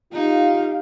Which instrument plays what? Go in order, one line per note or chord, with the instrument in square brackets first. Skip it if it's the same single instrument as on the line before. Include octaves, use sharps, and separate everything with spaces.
[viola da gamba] D#4 [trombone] F4 [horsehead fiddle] G4 F5